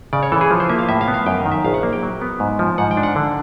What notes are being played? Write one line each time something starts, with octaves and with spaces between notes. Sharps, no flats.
C#3 D5
C#5
E3 A4
G#4
F3
C5
A#3 E5
F5
A2 E5
F5
B3
F5
F#2 G5
D#5
D#3
E5
A#1 F5
F#5
A#3
G5
F#3
B3
G#2
F3
G#2 F#5
G5
D4
F#5
D3